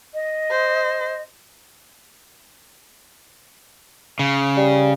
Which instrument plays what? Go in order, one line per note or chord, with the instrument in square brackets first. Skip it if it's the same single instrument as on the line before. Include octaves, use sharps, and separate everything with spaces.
[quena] D#5
[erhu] C5
[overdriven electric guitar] C#3
[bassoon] G3